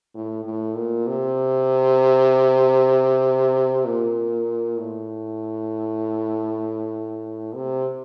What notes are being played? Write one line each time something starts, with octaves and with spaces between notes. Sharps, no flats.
A2
A2
A#2
C3
A#2
A2
C3